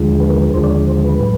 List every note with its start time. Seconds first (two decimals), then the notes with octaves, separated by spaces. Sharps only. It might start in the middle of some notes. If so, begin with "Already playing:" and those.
Already playing: D#2 D3 F3 G#3
0.20 B4
0.30 A#4
0.39 B4
0.54 D#2 D3 F3 G#3 C5
0.64 D5
0.70 C#5
0.87 C5
1.04 B4
1.20 A2 F#3 A3